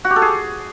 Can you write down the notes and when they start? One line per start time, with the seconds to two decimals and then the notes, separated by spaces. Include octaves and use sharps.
0.05 F#4
0.10 G4
0.16 A4
0.22 G#4